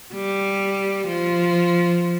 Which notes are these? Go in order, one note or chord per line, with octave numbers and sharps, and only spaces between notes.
G3
F3